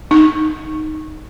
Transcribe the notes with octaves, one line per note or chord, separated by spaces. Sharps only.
D#4